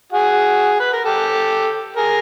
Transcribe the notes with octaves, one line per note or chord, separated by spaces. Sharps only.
F#4 G#4
B4
A#4
G4 A4
G#4 A#4